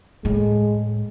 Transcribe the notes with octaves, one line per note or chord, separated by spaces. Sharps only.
A2 G#3